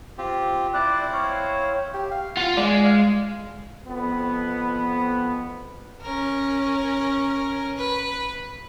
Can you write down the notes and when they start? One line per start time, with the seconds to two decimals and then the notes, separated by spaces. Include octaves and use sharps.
0.18 C4 F4 G4
0.74 C4 E4 C5 D5 D6 F#6
1.13 C#5 F5
1.94 G4
2.11 F5
2.37 F4 F5 F#5
2.57 G#3 D5
2.85 F5
3.87 F2 B3
6.01 C#4 A#4
7.77 B4